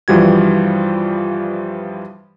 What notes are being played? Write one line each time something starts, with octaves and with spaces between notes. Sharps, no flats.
G2 E3 F3 G3 F#4 G#6